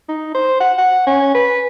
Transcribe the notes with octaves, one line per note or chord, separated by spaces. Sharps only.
D#4
C5
F#5
F#5
C#4
B4